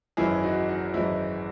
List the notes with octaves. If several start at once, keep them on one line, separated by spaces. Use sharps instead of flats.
G#1 F#2 E3 G#3 E4 G#4
D#4 F#4
D#4
G#1 F#2 E3 G#3 E4